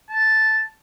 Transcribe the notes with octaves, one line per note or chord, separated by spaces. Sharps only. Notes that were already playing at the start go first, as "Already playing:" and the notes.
A5